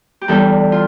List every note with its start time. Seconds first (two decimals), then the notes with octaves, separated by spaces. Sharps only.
0.21 G4
0.28 E2 E3 G3 D4 A4
0.72 F4